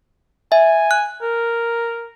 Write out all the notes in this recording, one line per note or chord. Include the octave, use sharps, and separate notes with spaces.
E5 G#5
F#6
A#4